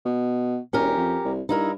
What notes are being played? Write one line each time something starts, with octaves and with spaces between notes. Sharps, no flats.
B2
E1 C#4 G4 A#4
F2
C2
G2 D#4 E4 A#4